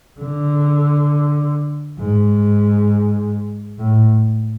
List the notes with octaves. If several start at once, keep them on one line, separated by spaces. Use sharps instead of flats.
D3
G#2
A2